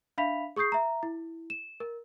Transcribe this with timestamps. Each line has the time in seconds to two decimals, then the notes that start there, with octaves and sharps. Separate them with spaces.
0.18 D4 E5 F5 B5 B6 F7
0.56 G#4 C#6 D#6 G6 C7
0.72 E5 A#5
1.03 E4
1.50 E7
1.80 A#4